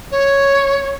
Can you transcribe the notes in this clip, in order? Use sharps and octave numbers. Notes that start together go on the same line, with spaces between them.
C#5